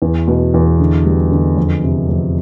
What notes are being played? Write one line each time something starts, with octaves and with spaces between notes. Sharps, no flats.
E2
B2
E2
D3
G3
D3
F2
C3
F2